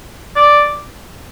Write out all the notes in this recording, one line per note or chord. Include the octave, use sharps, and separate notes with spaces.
D5